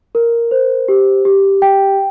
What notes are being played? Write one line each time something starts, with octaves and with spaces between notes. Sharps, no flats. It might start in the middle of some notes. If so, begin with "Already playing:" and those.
A#4
C5
G4
G4
G5